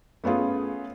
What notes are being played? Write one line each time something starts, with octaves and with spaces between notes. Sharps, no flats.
A3 B3 C#4 F4 G#4